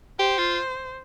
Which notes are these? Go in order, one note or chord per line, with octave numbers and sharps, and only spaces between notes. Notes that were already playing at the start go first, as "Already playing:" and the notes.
G4 C5
F4